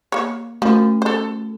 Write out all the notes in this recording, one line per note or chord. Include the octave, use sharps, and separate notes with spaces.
A#3 C#5
F3 A3 C#4
A4 C5